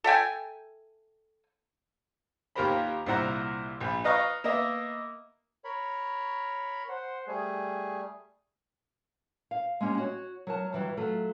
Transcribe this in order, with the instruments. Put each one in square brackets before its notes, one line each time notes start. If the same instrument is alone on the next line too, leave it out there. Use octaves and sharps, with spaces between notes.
[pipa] A4 E5 G5 G#5
[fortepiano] D#2 F4 G4 A#4 C5 B5
C2 A#2 E4 C5 F#5 A#5
A#1 B5
B4 D#5 F5 A#5 C#6
A#3 B3 D#5 E5
[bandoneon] A#4 C#5 B5
[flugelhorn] C5 [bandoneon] F#5
[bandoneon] G3 A3 [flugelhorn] G#4
[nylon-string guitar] F5
G#3 A#3 C#4 G4
F#4 C#5
F#3 A#4 A5
G2 E3 F#3
F#3 A3 F4 A4